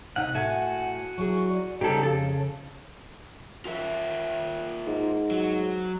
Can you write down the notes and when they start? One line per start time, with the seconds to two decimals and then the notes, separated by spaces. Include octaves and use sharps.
0.16 C3 D#4 D#5 F#5
0.35 A2 A3 F#4 E5 F#5 G#5
1.18 F#3 E4 G#4 C#6
1.50 D5
1.81 C#3 G3 C4 D#4 G4 A4 A#5
2.03 F2 A4 F5
3.65 F4 A#4 E5
4.87 G#2
5.31 F#3